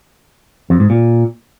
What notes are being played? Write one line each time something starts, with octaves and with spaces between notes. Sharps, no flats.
F2
G#2
A#2